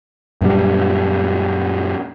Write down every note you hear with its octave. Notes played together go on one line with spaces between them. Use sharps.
F#2 A#2 G3